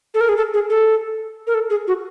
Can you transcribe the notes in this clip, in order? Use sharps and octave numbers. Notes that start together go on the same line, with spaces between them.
A4
A#4
G#4
A4
G#4
A4
A#4
A4
G#4
F#4